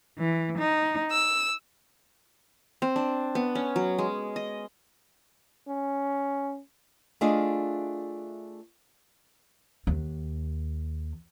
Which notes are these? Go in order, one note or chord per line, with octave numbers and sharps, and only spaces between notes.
E3
D#4
E6
C4
D4
B3
C#4
F#3
G#3
D#5
C#4
A3 D4 F4 G#4 D#5
D#2